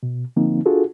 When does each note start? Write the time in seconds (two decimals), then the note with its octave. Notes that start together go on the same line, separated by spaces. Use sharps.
0.03 B2
0.36 D3 F3 A#3 C4 D#4
0.66 D4 F4 F#4 G#4 A4